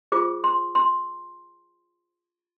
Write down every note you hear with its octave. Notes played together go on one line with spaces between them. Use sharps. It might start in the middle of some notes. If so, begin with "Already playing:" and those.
F4 G#4 C5 D6
C6
C6